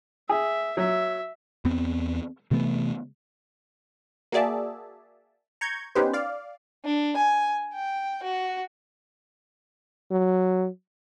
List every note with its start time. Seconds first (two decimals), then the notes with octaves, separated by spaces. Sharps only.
0.29 G#4 E5
0.77 F#3 E5
1.65 E2 B3 C4
2.51 C3 E3 A3 B3
4.32 A#3 F#4 G#4 D5 E5 A5
5.61 A#5 C#6 G6 G#6
5.95 B3 C#4 D#4 G4 B4 C5
6.13 D5 F5
6.85 D4
7.16 G#5
7.74 G5
8.23 F#4
10.11 F#3